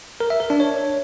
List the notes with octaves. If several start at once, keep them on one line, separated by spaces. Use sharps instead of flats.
A#4
E5
A#4
D4
C#5